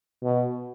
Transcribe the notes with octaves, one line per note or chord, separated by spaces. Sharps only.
B2